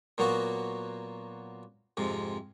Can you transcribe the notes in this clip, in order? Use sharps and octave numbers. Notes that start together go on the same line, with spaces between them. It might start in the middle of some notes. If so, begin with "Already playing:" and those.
A#2 F#3 A#3 B3 F#4
F2 G#2 C3